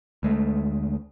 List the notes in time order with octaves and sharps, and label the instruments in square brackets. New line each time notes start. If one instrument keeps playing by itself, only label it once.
[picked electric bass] D2 G#3 A3